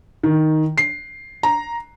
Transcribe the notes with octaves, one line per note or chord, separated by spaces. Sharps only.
D#3
C7
A#5